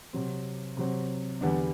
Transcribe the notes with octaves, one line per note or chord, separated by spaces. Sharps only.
C3 F#3 C4
C3 F#3 C4
E2 D3 G3 B3 D4